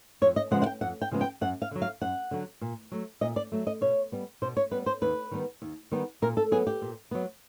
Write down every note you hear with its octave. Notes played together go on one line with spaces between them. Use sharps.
F2 C#5
D#5
C#3 F3 G#3 B3 F#5
F#5
G5
F2 F#5
G5
C#3 F3 G#3 B3
G5
F#2 F#5
F5
D3 F#3
F5
F#2 F#5
D3 F#3
A#2
F#3 A3
A#2 D#5
D5
F#3 A3
D#5
B2 C#5
G3 B3
B2 C5
C#5
G3 B3 B4
C5
D#2 B4
D#3 G3 B3
D#2
D#3 G3 B3
A#2 A#4
A4
F#3 B3 G#4
G4
A#2
F#3 B3